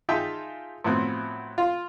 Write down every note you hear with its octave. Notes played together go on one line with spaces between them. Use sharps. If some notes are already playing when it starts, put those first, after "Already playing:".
D#4 F4 G#4 E5 G5 A5
A2 F3 F#3 B3 C4
F4 F5